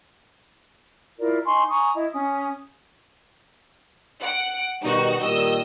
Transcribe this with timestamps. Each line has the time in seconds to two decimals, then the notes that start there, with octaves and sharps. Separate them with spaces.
1.18 E4 F4 A#4 D5
1.44 D#4 G#5 C6 C#6
1.69 G#5 A#5 C#6 D#6
1.94 E4 D#5
2.12 C#4 D#6
4.22 F#5 D7
4.83 B2 D#3 G3 D#4 F#4
5.21 A#2 D#3 G3 D#5 E6